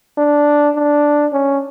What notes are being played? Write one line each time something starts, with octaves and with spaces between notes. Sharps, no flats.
D4
D4
C#4